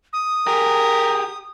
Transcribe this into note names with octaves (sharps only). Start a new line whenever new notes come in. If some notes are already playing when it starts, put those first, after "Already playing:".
D#6
G4 G#4 A#4